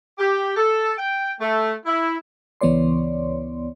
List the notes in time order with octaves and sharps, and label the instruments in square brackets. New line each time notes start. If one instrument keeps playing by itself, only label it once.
[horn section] G4
A4
G5
A3
E4
[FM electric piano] C#2 E3 B3 C#5 D5 C6